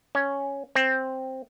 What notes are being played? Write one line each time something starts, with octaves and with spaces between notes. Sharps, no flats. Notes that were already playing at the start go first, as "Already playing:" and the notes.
C#4
C4